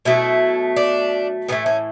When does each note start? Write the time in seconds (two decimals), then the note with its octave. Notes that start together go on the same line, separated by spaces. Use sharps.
0.05 B2 F#3 A3 E4
0.76 D4
1.48 A2 E3 A3 B3
1.66 C#4